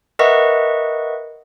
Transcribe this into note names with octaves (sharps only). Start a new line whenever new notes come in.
A#4 B4 D#5 E5 F#5 C#6